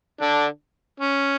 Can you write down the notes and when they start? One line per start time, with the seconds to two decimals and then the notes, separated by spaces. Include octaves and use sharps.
0.21 D3 D4
1.00 C#4